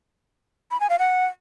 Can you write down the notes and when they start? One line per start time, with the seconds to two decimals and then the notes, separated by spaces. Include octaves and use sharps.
0.71 B5
0.80 G#5
0.90 F5
0.99 F#5